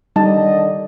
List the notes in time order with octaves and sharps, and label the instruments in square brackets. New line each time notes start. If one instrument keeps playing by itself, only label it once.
[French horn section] D3 D#3 D#5 [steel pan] G3 D#4 A5